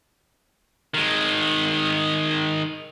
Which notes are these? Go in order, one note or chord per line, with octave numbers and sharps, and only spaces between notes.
D#3 G#3